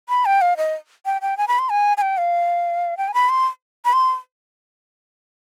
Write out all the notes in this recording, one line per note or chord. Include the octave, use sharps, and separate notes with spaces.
B5
G5
F5
D#5
G5
G5
G#5
B5
C6
G#5
G#5
G5
F5
G5
G#5
B5
C6
B5
C6